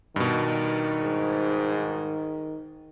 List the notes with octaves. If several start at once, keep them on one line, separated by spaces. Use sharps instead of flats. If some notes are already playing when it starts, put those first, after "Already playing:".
G2 B2 D#3
G#2